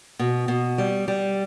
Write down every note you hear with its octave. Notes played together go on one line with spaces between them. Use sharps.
B2
B2
G3
G3